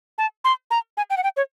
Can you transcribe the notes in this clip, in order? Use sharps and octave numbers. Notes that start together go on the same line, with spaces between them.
A5
C6
A#5
G#5
G5
F#5
G5
C#5